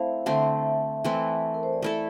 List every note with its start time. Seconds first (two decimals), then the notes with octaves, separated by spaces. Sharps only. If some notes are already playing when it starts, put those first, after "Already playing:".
Already playing: A3 C4 E4 C5 E5 F5
0.26 D3 A3 C4 E5
1.04 E3 A3 C4 E4
1.54 A#4
1.63 C5
1.73 D5
1.82 A3 E4 A4 E5